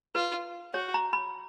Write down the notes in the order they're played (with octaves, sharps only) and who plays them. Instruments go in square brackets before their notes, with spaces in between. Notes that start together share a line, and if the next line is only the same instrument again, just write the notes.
[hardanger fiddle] F4 [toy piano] B4
[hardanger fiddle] F#4 [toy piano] C#5
[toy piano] A#5
B5